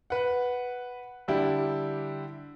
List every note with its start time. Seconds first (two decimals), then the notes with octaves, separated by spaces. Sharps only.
0.10 B4 F#5
1.28 D3 G3 E4 G4